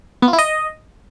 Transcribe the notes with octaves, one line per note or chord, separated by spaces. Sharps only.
B3
F4
E4
D#5